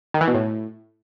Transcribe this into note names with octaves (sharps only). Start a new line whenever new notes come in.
D#3
E3
B2
A2